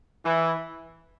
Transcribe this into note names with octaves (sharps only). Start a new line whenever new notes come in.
E3